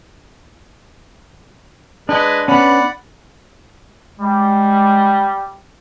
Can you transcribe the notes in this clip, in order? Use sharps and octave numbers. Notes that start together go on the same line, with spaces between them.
G#3 D4 B4 D#5
B3 C#4 D5 F#5 B5
G3 G#3